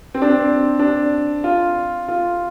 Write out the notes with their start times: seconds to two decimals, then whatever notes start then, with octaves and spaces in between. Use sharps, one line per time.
0.15 C4
0.22 D4
0.29 C4
0.79 D4
1.44 F4
2.08 F4